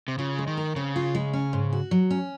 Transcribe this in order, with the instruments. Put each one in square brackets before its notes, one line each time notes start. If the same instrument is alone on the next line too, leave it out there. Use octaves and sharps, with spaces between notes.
[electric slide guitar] C3
[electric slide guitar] C#3 [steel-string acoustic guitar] F4
[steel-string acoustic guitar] G#3
[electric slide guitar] D#3
[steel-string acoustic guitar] A#4
[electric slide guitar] C#3 [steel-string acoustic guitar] C4
[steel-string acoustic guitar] F4
G#3
C#4
G#2
F#4
F#3
C#4